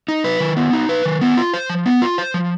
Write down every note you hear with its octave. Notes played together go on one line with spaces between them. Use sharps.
D#4
B4
D#3
B3
D#4
B4
D#3
B3
F4
C5
F3
B3
F4
C5
F3